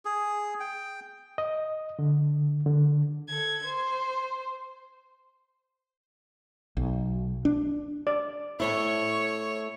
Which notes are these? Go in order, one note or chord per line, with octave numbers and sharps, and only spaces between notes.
G#4
G5
D#5
D3
D3
A4 G#6
C5
B1
D4
D5
A2 A3 E4 C#5